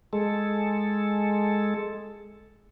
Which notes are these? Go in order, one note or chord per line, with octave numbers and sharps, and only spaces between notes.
G#3 A4